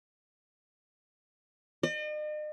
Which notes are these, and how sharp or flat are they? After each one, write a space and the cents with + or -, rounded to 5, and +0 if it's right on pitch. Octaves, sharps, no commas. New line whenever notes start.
D#5 -45